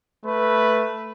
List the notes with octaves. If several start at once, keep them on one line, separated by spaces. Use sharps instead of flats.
A3 B4